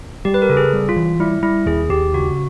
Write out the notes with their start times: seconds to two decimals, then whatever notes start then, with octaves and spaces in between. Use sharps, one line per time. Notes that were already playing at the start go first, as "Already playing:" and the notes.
0.25 G3 G4
0.34 B4
0.42 A#4
0.49 C#3 A4
0.57 G#4
0.73 G3
0.89 F4
0.96 E3
1.19 G3 E4
1.43 G3 E4
1.66 D#2 G#4
1.89 D#2 G4
2.14 C#3 F#4